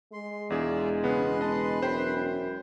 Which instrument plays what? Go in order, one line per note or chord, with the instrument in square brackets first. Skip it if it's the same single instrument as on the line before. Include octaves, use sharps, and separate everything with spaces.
[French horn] G#3 [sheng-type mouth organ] C6
[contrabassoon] E1 [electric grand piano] E2 G#4 [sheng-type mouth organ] F4 D5 E5
[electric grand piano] C#3 B3 [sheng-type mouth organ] B4 C6
[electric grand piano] D#5 A5
[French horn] F#2 [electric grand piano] C5 G5 B5